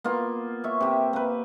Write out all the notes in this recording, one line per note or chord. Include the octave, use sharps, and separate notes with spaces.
A#3 B3 F4
C#5 E5
C3 G4
A#3 B4